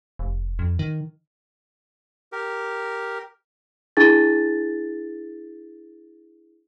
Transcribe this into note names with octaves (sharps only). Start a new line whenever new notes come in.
F1
F2
D#3
G4 A#4
D4 E4 G#4 A6